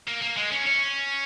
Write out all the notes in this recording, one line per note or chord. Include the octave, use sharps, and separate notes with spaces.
A#3
A#3
G#3
C#4
C#4